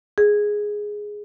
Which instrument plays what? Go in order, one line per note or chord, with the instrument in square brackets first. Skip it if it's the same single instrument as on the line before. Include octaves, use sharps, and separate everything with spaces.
[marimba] G#4